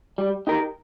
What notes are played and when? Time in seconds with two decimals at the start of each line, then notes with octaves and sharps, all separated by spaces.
0.18 G3
0.47 D#4 G4 A#4